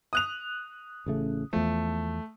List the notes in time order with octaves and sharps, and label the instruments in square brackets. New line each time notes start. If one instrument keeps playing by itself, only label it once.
[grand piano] D#6 F#6 F7
[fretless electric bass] A1 C#3 A3
[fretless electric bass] E2 F3 [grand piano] A3